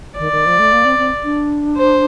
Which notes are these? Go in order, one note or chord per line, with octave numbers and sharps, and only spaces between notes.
D#3 D5
D#3
F3
A3
A#3
C4
C4
D4
C5